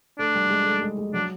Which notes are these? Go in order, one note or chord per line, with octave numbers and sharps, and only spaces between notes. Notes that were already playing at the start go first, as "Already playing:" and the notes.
A3 D4
G3
G#3
A3
G#3
G#3
F#3 D4